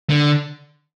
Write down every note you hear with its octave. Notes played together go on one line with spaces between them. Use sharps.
D3